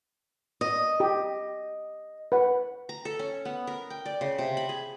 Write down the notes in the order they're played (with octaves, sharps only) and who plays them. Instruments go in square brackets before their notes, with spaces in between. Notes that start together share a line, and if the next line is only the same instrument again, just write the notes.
[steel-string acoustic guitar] D#5
[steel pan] G4
B4 F#5
[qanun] A#5
A4
C#4
B3
A#4
G5
D5
C#3
C3
B5
G#4